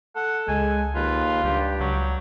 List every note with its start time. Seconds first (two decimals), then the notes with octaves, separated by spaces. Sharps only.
0.16 A4 F#5
0.48 C#2 G#3 G#5
0.95 D#2 F4 B4
1.44 C#2 G2 G4
1.80 C#2 F#3